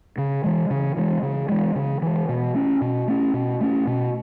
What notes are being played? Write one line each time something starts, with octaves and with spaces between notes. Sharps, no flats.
C#3
E3 G#3
C#3
E3 G#3
C#3
E3 G#3
C#3
E3 G#3
B2
A3 C#4
B2
A3 C#4
B2
A3 C#4
B2